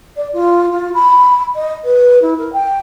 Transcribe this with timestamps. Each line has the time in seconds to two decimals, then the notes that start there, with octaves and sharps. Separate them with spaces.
0.17 D5
0.33 F4
0.71 F4
0.94 B5
1.56 D#5
1.85 B4
2.22 E4
2.39 A#4
2.53 G5